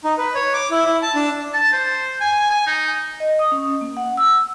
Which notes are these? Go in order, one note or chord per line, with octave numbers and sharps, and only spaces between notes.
D#4
B4
C#5
D6
E4
E4
A5
D4
A5
C5
G#5
G#5
D#4
D#5
D#6
C#4
A#3
F#5
E6